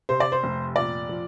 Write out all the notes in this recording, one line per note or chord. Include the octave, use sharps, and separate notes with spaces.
C3 C5
D5
C5
F1
A#2 D5
F3